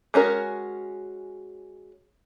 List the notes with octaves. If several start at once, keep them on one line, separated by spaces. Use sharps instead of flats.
G#3 C#4 F#4 A#4